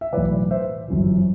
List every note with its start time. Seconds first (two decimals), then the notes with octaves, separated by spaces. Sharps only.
0.01 E5
0.12 B1 A2 E3 B4 D5
0.51 C5 E5
0.88 G1 F#2 E3